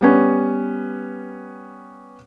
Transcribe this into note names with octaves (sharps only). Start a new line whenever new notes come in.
G3 B3 C#4